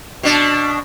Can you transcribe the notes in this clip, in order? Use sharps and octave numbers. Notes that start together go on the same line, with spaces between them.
B2 D4